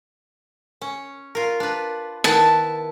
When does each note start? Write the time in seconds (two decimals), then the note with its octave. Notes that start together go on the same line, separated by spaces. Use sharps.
0.82 C#4
1.35 F4 A#4
1.60 D4 B4
2.24 D#3 B3 E4 A5